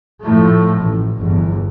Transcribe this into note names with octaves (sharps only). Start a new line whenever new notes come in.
A2 F3 A3
A1
G1 E2